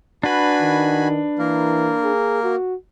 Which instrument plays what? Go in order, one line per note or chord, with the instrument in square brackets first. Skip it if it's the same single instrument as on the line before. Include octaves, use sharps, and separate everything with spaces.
[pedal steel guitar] D4 B4 [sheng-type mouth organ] F#4 G#5 B5
[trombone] D#3
[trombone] E3 [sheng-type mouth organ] A#3 A#4
[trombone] G#4
F#4